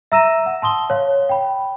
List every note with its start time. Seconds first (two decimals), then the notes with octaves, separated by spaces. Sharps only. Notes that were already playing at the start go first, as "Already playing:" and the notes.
0.12 E5 A#5 E6 A#6 D#7 E7
0.46 F#5
0.62 A5 C6 D#6 G7
0.90 C#5 F5
1.29 G5 B5